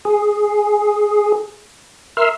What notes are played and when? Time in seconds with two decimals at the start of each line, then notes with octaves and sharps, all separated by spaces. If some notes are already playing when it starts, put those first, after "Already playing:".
0.05 G#4
2.17 A#4 E5 C6 E6 F6